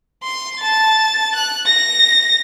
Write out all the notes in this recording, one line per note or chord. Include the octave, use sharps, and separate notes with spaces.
C6
A5 A6
F#6
A#6